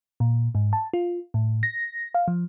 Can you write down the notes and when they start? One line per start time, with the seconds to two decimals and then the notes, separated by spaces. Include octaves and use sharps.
0.20 A#2
0.55 G#2
0.73 A5
0.93 F4
1.34 A2
1.63 A#6
2.15 F5
2.28 F3